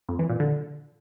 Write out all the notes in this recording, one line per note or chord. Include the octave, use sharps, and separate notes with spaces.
F2
E3
A#2
D3